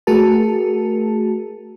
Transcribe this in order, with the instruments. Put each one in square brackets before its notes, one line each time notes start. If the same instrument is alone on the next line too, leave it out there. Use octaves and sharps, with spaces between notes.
[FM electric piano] A3 F#4 G#4 A#4 A5